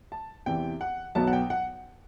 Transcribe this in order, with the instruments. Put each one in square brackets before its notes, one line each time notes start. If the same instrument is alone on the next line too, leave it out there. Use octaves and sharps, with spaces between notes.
[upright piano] A5
E2 C3 E3 G5
F#5
B1 B2 F#3 B3 A5
F#5
G5
F#5